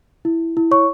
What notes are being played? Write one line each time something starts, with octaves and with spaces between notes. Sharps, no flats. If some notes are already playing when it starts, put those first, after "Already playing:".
E4
E4
C#5 C#6